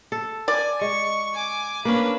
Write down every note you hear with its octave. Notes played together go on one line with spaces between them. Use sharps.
A4
D5 G#5
G#3 C#6
G#5 D6
A#3 C#4 D4 B4